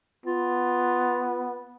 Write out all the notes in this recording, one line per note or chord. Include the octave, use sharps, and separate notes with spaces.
B3 F4